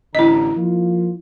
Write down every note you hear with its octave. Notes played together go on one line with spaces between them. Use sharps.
A1 D3 E4 D#5 A#5
F3 A#3 F4